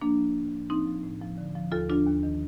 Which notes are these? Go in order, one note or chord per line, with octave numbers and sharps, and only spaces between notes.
F3 A#3 D4
F3
A2
F3
F3 C4 D#4
F3
A2
F3
D3
F3
D#2 F4 A4
F3 D4 F4
D#2
D#3